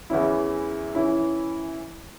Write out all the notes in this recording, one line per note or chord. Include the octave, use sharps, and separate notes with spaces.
E2 E3 C#4 E4
E3 C#4 E4